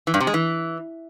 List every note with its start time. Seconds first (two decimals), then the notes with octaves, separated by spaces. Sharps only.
0.07 E3
0.14 G2
0.20 C3
0.27 G#3
0.34 E3